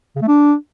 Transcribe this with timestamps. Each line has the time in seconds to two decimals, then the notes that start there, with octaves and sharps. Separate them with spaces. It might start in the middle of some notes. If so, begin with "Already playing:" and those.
0.16 C#3
0.22 A3
0.28 D4